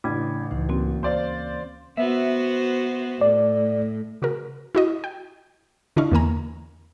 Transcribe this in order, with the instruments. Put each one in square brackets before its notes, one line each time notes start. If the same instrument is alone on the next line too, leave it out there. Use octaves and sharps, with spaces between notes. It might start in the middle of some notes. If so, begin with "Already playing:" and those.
[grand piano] A1 [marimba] C#3 [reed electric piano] D4 E4 B5 [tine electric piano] D6 G#6
[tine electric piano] C#2 C#3 D#4 [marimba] E3
[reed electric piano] A#3 C#4 [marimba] C4 F#4
[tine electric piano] D2 [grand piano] C5 D5 F5
[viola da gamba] B3 F#4 C5 [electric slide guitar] E5
[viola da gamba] A2 [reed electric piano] D5
[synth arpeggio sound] C#3 F#4 G#4 A#4
E4 F#4 D#5
G5
D3 D4 E4 D#5 F5 C#6
E2 D3 A#3 A#4 G#5 A#5